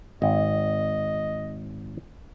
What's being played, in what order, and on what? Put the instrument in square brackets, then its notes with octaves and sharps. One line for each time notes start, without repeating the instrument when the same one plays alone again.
[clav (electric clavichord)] G#1 [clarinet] D#5